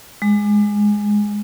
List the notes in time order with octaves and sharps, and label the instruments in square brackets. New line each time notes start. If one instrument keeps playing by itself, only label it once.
[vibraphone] G#3